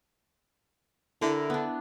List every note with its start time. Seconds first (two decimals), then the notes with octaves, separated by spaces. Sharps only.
1.21 D3 E4 A#4
1.50 B3 D4